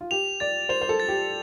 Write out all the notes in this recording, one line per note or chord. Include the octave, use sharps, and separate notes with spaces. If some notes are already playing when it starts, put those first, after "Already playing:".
F4
G4 F7
D5 A6
C5 F7
C5
A4
A6
G4